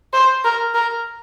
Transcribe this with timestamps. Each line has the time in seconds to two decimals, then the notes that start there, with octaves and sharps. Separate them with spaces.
0.13 C5
0.44 A#4
0.74 A#4